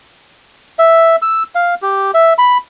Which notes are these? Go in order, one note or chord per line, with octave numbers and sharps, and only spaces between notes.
E5
E6
F5
G4
E5
B5